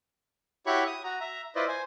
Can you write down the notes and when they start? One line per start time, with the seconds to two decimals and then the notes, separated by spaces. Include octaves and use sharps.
0.66 E4 F#4 G4 C#5 B5 C#6
0.87 D#6
1.04 F#4 A#5
1.20 E5 A#5
1.55 E4 F4 B4 C5 D5 D#5
1.68 C5 G#5